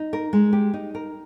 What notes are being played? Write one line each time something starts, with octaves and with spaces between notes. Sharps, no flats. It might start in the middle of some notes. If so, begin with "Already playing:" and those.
Already playing: D#4
A#4
G#3
G4
D#4
A#4